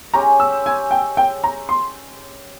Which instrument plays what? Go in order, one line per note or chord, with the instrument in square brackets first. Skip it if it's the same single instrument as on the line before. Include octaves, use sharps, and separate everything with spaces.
[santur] G#3 C#4 G4 [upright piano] A#5
[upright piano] E6
G#5
G5
G5
A#5
C6